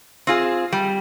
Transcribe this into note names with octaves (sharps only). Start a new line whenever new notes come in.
C4 F4 G#4
G3